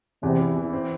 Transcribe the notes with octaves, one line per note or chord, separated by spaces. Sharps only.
E2 C3
E4
E3
C4